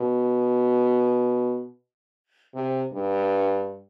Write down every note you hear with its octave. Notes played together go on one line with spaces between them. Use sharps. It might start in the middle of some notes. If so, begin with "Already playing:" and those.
Already playing: B2
C3
G2